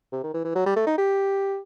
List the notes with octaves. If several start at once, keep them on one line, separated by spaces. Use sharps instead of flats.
C3
D#3
E3
E3
F#3
G3
A3
D#4
G4